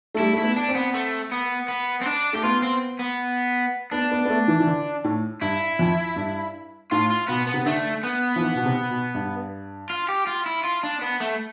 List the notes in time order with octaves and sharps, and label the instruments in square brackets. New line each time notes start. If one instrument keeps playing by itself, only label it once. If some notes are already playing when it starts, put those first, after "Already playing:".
[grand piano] A3
[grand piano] G3 [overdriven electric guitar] E4
[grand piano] A3 [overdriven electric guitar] E4
[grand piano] B3
[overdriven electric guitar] D4
[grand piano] C4
[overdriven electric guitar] B3
A3
B3
B3
C4
D4
[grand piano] A3 [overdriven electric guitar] G4
[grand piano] B3 [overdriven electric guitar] F4
[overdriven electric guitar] C4
B3
[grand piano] B3 [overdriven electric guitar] D4
[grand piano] B3
B3
A3
E3
E3
D3
A2
[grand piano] G2 [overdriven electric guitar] E4
[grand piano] F2
G2
[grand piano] A2 [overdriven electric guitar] F4
[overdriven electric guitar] F4
[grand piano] B2 [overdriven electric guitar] B3
[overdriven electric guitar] B3
[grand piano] C3
[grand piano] D3 [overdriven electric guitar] A3
[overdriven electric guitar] B3
[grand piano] F3
E3
B2
C3
B2
G2
[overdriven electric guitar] F4
G4
F4
E4
F4
D4
B3
A3